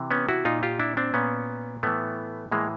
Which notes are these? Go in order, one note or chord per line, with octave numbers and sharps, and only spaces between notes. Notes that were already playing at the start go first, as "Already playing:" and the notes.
Already playing: C3 E3
B3 C#4
E4 F#4
A#2 D#4 F4
F4 G4
D4 E4
C4 D4
A#2 B3 C#4
A2 E3 A3 B3
A2 E3 G#3 A#3